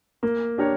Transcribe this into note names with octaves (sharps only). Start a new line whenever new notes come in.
A#3
D4 G4 A#4 C#5